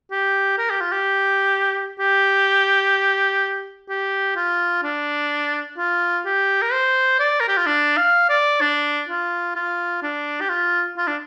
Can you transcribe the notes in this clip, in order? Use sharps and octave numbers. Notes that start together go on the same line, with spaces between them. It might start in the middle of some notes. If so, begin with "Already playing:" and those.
G4
A#4
G4
F4
G4
G4
G4
F4
D4
F4
G4
A#4
C5
D5
A#4
G4
F4
D4
F5
D5
D4
F4
F4
D4
G4
F4
F4
D4